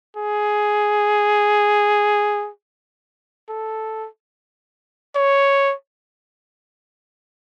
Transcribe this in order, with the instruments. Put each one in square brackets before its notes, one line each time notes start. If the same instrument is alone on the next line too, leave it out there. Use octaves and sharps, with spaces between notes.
[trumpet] G#4
A4
C#5